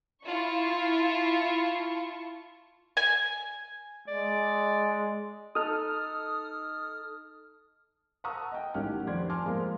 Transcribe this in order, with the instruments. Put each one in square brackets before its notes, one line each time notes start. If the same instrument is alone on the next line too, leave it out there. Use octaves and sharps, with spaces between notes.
[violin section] E4 F4 A5 C#6
[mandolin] G#5
[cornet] G#3 [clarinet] D5
[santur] D#4 A4 [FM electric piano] D#6 F6
[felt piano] F#5 A5 A#5 C#6 D#6 E6
D#5 G5
A1 D#3 C#4 G4 F#5 F6
F1 F3 D5 C6 G#6
G#5 A5 C6 D6 F6
F3 G#3 A#3 F4 A#4